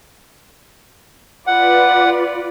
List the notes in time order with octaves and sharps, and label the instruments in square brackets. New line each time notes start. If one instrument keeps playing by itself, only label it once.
[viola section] F4 B4 D5 [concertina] F#5